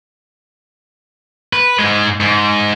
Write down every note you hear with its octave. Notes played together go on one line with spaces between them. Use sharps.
B4
G#2 G#3
G#2